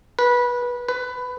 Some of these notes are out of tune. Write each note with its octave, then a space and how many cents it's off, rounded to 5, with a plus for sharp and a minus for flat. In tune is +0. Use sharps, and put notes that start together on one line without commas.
B4 -20
B4 +15